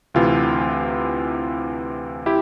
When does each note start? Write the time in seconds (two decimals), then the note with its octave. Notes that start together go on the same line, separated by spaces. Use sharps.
0.14 D2 C3 E3 F4
2.26 E4 G4